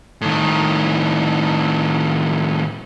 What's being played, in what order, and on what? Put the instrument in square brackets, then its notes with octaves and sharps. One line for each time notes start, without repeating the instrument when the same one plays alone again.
[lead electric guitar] A2 D#3